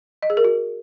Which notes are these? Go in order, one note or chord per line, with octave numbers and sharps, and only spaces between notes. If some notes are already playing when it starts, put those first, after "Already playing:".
D#5
G#4
A#4
F#4